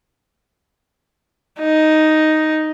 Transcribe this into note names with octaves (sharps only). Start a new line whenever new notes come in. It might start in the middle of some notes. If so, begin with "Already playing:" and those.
D#4